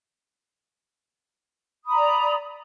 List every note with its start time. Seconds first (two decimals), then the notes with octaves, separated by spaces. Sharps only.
1.83 D#6
1.87 B5
1.91 A#5
1.95 D5